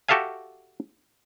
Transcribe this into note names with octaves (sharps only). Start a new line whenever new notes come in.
F#4 G4 A4 E5 F5 G#5